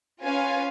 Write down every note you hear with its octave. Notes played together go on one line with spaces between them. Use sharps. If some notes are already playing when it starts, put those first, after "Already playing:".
C#4 F4 B4 F5 G#5